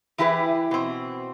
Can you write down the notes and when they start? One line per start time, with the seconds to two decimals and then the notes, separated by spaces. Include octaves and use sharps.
0.18 E3 E4 G4 G#4 B4
0.71 B2 C4